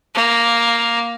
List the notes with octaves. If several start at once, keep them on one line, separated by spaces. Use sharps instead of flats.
A#3